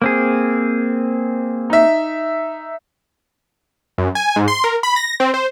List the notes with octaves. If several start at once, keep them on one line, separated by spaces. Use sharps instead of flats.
A#3 C4 G#4
D#4 E5
F#2
G#5
G#2
C6
A#4
B5
A#6
C4
C5